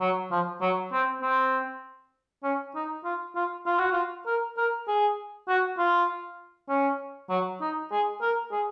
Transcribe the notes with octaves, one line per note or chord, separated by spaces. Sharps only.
F#3
F3
F#3
C4
C4
C#4
D#4
F4
F4
F4
F#4
F4
A#4
A#4
G#4
F#4
F4
C#4
F#3
D#4
G#4
A#4
G#4